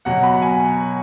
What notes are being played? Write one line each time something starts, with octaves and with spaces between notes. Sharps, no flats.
B2 F#3 F#5
B5
G#5